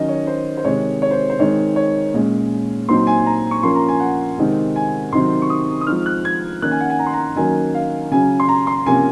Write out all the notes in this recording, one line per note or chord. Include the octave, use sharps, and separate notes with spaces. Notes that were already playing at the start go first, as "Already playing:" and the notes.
Already playing: D#3 F#3 C#4 D#5
C#5
C5
C5
C3 D#3 G#3 C#5
C#5
C5
C5
D#3 G#3 C4 D#4 C#5
C#5
A#2 G#3 C#4
A#2 F#3 C4 D#4 C6
G#5
A#5
C#6
F3 A#3 C#4 C6
A#5
G#5
F#5
C3 D#3 G#3 C4 D#4
G#5
C3 D#3 F#3 C4 D#4 C6
C#6
D#6
D#6
F3 G#3 C4 D#4 F6
F#6
G#6
D#3 A#3 C#4 F#6
G#5
F#5
G#5
A#5
C6
A#5
D#3 F#3 A#3 C#4 G#5
F5
C#3 F#3 C#4 G#5
C6
A#5
C6
C3 F3 A#3 C#4 G#5